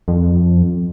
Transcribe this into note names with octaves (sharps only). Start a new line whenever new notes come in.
F2